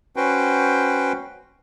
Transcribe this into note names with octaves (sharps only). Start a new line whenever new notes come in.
C#4 F#4 B4 C5 G5